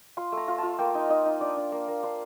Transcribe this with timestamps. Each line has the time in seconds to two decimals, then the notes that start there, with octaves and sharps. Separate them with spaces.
0.17 F4 C6
0.32 A3
0.37 A#5
0.48 F4
0.58 F4 A5
0.79 A#3 G5
0.95 D#4
1.09 D#4 D#5
1.26 D#4
1.40 D4 D5
1.56 D4
1.72 A#3
1.88 A#3
2.03 D4 C5